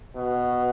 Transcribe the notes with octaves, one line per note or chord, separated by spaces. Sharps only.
B2